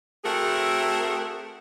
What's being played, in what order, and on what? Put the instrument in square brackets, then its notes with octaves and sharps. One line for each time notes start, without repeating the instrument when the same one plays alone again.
[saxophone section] A3 C4 F#4 G#4 A#4